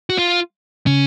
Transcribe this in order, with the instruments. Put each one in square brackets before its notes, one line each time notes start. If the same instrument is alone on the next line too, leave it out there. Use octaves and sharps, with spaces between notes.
[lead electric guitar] F#4
F4
[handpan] C#3 [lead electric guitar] C#4